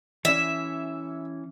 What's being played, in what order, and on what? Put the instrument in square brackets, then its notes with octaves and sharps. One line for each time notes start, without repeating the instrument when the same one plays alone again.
[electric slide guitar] E3 C#4 [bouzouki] E5